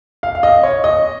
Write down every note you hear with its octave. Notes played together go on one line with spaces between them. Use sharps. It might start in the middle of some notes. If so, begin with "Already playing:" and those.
F5
F5
D#5
C#5
D#5